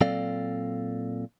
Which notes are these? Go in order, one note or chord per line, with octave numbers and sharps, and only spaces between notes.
A#2 F#3 C4 A4 D5 F5